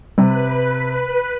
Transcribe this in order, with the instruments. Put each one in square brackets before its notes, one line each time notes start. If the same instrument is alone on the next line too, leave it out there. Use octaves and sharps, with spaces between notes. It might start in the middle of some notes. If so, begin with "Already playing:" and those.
[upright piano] C3 [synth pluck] G3 C4 [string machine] B4